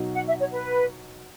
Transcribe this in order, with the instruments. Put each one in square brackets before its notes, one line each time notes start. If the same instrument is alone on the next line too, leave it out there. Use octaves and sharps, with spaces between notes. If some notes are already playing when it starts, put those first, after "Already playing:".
Already playing: [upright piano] B2 F#3 D#4
[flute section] F#5
E5
C#5
B4